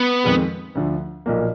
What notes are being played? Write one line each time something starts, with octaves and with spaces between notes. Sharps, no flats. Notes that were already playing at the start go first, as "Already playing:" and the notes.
Already playing: B3
F2 D#3 G#3
D2 D3 F3
B1 A#2 F3 A#3